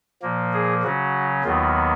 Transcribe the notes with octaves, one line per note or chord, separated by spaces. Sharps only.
A#2 F3 A#3
G#4
C#3 F#3 C#4 F#4
D#2 D#3 F#3 B3 F4